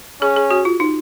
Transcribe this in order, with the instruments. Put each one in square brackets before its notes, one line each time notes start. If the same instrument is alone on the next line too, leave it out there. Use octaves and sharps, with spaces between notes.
[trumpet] C#4 [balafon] G#4
[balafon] G#4
F#4
F4
D#4